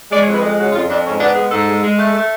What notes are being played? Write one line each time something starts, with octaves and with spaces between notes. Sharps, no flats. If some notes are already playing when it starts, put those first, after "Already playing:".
G#3 D5
C#5
F2
B4
G#3
C#3 F#4
F2 F4
F2 D4
G#2 C#4
B3 D4
G#3 G#4
G#2 A4
G#3
G#3
A3
A3